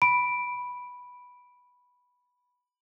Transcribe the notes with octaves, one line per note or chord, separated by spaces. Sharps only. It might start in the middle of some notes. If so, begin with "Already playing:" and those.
B5 D7